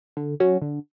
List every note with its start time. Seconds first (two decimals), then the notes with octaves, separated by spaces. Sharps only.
0.17 D3
0.40 F#3 C#4 F#4
0.62 D3